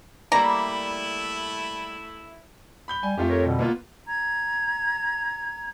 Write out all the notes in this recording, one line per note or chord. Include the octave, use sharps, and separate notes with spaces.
G3 A3 A#3 E4 D5 A#5
B5 G6 G7
G3 G#5
F2 A3 F4 G4
A4 A#4 C#5
B2 D3 G3
A#3 B3 F4
A#5 G#6